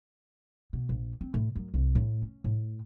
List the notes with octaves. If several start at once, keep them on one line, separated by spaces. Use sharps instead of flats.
B2
A#1
C4
A2
F#2
C2
A2
C#4
A2